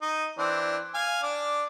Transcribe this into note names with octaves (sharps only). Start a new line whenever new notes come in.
D#4
E3 C4 D4
F5 G#5
D4 D6